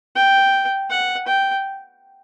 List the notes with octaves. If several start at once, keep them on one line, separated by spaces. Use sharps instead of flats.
G5
F#5
G5